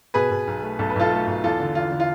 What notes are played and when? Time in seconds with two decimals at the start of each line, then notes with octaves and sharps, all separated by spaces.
0.14 B2 G#4 B4
0.31 B2
0.47 B1
0.62 A3
0.79 B1 A4
0.90 B4
0.96 B1 F4 A4
1.11 A3
1.27 B1
1.44 E2 F4 A4
1.60 D3
1.75 E2 F4
1.91 D3
2.00 F4